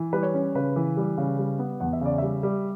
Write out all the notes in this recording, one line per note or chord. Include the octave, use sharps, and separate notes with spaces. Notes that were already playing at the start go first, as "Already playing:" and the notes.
Already playing: E3
G3 B4
C#5
C#4
C#3 B4
E3
G3
C#3
G3
B3
E2 F#5
E5
C#3 D5
G3 E5
G3